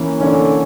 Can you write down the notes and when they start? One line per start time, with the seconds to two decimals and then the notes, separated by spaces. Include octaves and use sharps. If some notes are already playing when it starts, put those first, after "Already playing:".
Already playing: E3 A#3 C#4
0.20 D3 E3 A#3 C#4